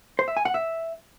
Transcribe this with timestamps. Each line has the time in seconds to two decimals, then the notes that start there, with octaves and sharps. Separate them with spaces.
0.19 C5
0.28 E5
0.37 G#5
0.45 F#5
0.54 E5